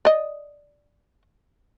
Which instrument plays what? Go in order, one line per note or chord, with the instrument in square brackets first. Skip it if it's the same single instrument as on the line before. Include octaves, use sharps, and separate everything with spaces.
[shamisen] D5 D#5